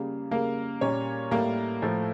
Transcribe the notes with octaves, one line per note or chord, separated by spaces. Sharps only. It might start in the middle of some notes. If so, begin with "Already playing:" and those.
Already playing: C#3 G3 A#3
C#3 G3 A#3 A#4
A#2 G3 A#3 C#4 C#5
A2 G3 A#3 A#4
A2 F3 A3